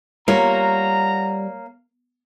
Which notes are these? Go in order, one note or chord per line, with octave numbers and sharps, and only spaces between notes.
G3 A#3 F4 A#4 C#5 F#5 A#5